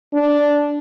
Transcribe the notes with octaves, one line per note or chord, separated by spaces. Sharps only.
D4